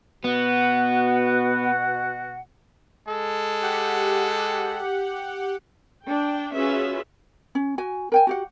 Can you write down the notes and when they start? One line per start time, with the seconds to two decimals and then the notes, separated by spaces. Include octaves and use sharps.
0.24 B2 B3 F#4 F#5
3.07 G#3 A4
3.62 G4 F#5
6.05 D4 G5
6.54 C#4 F4 F#4 G#4 B4 E5
7.55 C#4
7.78 F#4 G#5
8.12 A#4 G5 G#5
8.27 F#4 G4 F#5